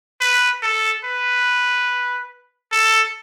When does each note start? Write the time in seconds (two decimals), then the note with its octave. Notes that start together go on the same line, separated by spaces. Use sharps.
0.20 B4
0.62 A4
1.04 B4
2.72 A4